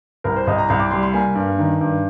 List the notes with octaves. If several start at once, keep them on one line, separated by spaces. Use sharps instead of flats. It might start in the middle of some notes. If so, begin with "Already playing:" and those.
C2 A#4
C5
C2 D#5
A#5
C2 A#5
D6
G3 C6
C6
A#3 G#5
G2
D#3
G2